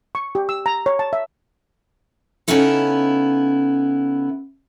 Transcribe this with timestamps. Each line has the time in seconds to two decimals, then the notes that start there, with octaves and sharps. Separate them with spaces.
0.15 C#6
0.35 G4
0.49 E6
0.66 A#5
0.86 C#5
0.99 A5
1.13 E5
2.48 C#3 B3 C#4 D#4 E4 A4